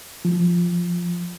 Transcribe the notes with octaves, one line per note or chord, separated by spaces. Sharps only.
F3